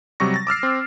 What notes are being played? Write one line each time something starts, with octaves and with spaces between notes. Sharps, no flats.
C3 F#3 G3 C#6 A#6
A6 A#6
D6 E6 F6 C7
C4